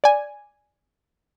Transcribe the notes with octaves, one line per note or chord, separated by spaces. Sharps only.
D5 G#5